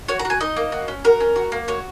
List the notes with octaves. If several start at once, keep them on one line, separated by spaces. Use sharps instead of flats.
F#4 C#5
A#5
F#4
G#5
D#4 D#5
A#3
F#4
C#4
F#4 A#4
C#4
F#4
A#3
F#4 C#5